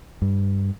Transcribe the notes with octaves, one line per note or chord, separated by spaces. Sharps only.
G2